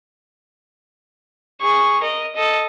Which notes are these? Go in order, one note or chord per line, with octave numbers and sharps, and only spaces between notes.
G#4 C#6
A#4 D#5
A4 D#5